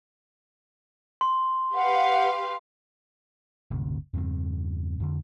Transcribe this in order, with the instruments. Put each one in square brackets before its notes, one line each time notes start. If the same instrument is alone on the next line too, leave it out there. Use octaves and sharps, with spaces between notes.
[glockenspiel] C6
[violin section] G4 B4 F5 [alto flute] F#5
[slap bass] D1 G1 D2 C3
E2 G2 C#3 C4
F2 D3